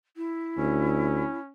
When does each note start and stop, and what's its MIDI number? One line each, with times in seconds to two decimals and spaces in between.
0.16 1.37 64
0.57 1.24 38
0.57 1.52 61